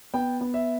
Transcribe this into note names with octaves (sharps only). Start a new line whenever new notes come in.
B3 G5
B3
E5